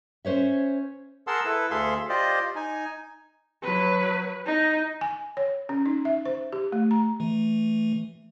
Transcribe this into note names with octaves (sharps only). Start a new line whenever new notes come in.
C#4 C5 C#5 E5
G#4 A#4 F#5 A5 C6 E6
E4 A4 B4
D2 G#4 A4 E5 F5 C6
F4 G4 C5 D5 D#5
D#4 G#5
F#3 B4
D#4
G#5
C#5
C#4
D#4
E5
C5
G4
A3
A#5
E3 A3